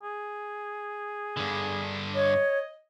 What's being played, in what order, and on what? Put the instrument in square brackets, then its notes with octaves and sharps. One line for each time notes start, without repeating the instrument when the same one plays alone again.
[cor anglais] G#4
[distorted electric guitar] G2 D3
[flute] C#5 [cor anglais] D#5